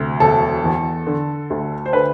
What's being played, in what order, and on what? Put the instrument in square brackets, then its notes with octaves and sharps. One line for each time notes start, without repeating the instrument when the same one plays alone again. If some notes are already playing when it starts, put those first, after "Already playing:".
Already playing: [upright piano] D2 C3
E1 A4
E2
D3
D2
C5
D3 B4